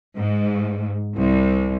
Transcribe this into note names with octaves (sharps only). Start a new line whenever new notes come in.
G#2
C2